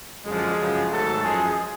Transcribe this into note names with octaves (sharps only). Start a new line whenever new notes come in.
F#2 D3 F3 G#3 G#4
F#2 C#3 F3
G#1 G#2 F#3 A3 A4
F#2 F3 G#3 G#4